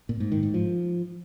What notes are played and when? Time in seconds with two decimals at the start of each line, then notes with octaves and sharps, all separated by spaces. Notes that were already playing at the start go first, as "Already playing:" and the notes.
0.09 A#2
0.20 G#2
0.32 D#3
0.43 G#2
0.54 F3